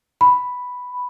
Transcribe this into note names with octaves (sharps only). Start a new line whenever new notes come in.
B5